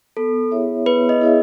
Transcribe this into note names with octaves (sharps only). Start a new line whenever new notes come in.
B3 A4
E4 G#4 C#5 E5
B3 B4
D#5
E4 G#4 C#5 E5